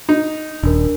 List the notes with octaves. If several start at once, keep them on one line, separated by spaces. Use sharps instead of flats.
D#4
D#1 D4 A#4